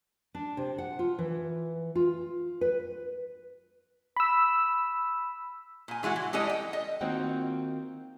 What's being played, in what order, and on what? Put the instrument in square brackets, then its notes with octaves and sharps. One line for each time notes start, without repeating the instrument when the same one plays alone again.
[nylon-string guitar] D4
C3
F#5
F4
E3
F4
B4
[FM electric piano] B5 E6
[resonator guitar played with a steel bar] A#2 G#5
E3 G#3 E4 F#4
E3
G3 G#3 E4 A4 D5 D#5
G5
D#5
[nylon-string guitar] D#3 A#3 C4 F4 F#4 F#5